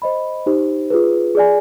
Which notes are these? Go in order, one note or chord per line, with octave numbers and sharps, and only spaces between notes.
C5 D#5 B5
D#4 G4 C5
F4 G#4 B4
G#4 D5 G#5